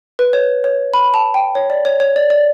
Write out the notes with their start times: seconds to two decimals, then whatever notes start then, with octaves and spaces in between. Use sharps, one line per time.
0.19 B4
0.33 C#5
0.64 C#5
0.94 B5
1.14 A5
1.34 G5
1.55 C#5
1.70 D5
1.85 C#5
2.00 C#5
2.16 D5
2.30 D5